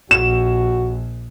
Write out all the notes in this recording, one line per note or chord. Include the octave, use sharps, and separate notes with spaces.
A#1 F#4 E7